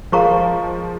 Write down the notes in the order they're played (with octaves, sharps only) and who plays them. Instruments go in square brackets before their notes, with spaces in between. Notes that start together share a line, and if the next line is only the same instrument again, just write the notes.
[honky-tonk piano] F3 G#3 [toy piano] A#4 F5 A#5 C#6